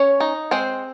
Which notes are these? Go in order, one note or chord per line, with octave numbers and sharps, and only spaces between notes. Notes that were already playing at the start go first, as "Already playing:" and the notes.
Already playing: C#4 C#5
D#4
G#3 C4 C5